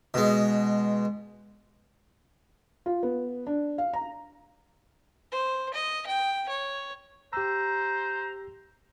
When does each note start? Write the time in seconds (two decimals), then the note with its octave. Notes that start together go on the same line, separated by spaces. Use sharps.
0.14 B2 G#3
2.86 F4
3.03 B3
3.47 D4
3.78 F5
3.93 A#5
5.32 C5
5.74 D#5
6.06 G5
6.49 C#5
7.33 G4 C5 A#5 E6